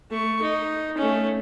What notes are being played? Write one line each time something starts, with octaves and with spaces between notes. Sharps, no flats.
A3 C#6
D#4
A3 C#4